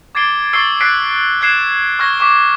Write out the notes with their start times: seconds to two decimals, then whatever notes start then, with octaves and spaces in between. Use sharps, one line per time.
0.15 D6 G#6 A6 C7 D7 G7
0.53 C#6 E6 A6 C7 D7 G7
0.81 F#6 A6 B6 C7 D7
1.41 F#6 G#6 C7 E7
1.99 C#6 F6 G#6 A#6
2.20 C#6 D6 B6